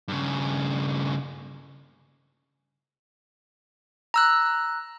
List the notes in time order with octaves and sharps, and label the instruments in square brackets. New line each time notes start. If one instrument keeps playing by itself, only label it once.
[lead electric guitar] G2 C#3
[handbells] A#5 E6 F#6